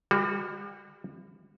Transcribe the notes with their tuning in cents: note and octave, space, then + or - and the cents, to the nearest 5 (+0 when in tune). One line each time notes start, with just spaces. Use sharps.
G3 +35 F#4 -10